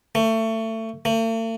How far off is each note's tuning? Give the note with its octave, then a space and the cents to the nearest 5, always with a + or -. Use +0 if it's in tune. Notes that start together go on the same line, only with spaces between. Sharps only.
A3 +25
A3 +45